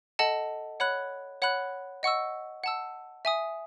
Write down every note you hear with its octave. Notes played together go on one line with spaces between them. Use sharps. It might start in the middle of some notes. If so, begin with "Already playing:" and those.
A4 D#5 F#5 A5
C#5 F#5 B5 F#6
C#5 F#5 B5 F#6
D#5 F#5 C#6 E6
F#5 A5 E6
E5 G#5 D#6